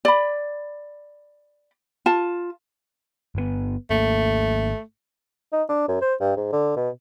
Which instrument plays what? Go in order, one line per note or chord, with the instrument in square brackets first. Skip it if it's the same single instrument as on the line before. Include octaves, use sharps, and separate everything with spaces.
[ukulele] D5 B5
F4 A5
[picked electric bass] G1 A#2 B3
[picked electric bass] G#1 A#3 [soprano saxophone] A3
[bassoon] D#4
D4
F#2
C5
G2
G#2
D3
B2